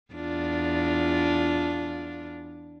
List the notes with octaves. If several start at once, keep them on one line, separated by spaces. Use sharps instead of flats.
E2 D4 F4